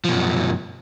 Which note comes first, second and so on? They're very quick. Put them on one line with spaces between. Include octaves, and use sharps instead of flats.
F3 B2 F#2